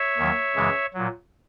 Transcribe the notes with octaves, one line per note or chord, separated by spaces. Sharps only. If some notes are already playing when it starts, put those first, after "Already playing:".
Already playing: C#5 E5
D#2 D#3 F#3
F#2 C#3 E3 G#3
A#2 F#3